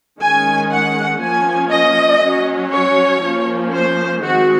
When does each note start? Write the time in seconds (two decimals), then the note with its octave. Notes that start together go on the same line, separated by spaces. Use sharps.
0.20 D#3 G#3 C#4 G#5
0.70 F#5
1.21 F3 A#3 C#4 G#5
1.71 D#5
2.22 F#3 C#4
2.72 C#5
3.22 F3 A#3 C#4
3.74 C5
4.23 D#3 G#3 C4 F#4